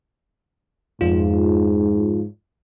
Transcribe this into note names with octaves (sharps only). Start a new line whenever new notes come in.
F2 G#2 F4